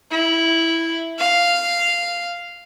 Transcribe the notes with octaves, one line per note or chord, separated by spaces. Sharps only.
E4
F5